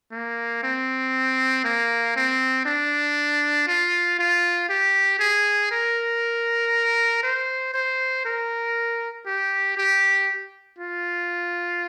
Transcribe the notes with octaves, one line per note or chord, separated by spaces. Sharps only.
A#3
C4
A#3
C4
D4
F4
F4
G4
G#4
A#4
C5
C5
A#4
G4
G4
F4